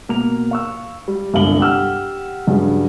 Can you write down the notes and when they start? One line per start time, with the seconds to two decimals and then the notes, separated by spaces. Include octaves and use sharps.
0.09 B2 A#3 A#5 F7
0.51 F5 C#6 E6
1.08 G3
1.34 G1 C2 F5 F#7 G7
1.60 G4 F#5 E6 F6
2.47 G2 C#3 F#3